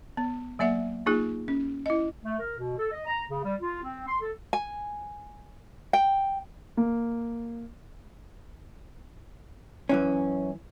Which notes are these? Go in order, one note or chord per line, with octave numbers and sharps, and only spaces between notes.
B3
F#3 A#3 D5 E5 F#5
A#3 D#4 F4 G#4
C#4
E4 D#5
A3
A#4
B2
A4
D#5
A#5
C#3
G3
F4
C4
C6
A4
G#5
G5
A#3
F#2 E3 C#4